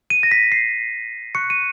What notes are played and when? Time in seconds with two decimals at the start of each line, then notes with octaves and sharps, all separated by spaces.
0.10 D#7
0.23 A#6
0.32 B6
0.52 C7
1.35 C#6 F#6 C#7
1.50 D#7